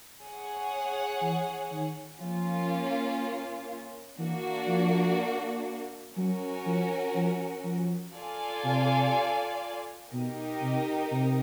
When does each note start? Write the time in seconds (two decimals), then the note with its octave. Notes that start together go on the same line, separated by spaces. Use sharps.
0.23 G#4 C#5 F#5
1.22 E3
1.71 D#3
2.21 F3 A#3 C#4 F4
4.19 E3 A#3 D4 F#4
4.68 F3
6.17 F#3 C#4 F#4 A#4
6.66 F3
7.16 F3
7.65 F3
8.15 F4 A4 D5 F5 G#5
8.64 C3
10.13 B2 D#4 G4 A#4 D#5
10.61 C3
11.11 C3